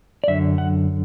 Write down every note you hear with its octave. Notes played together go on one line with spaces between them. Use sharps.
D5
F#2 D3 E5
F#5